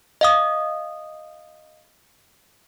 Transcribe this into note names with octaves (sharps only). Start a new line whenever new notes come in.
D#5 F5 D#6